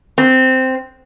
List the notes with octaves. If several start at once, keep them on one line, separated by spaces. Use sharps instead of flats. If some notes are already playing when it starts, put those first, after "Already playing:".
C4